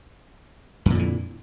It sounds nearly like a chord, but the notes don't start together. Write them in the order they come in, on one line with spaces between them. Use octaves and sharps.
F2 A#2 D3 E3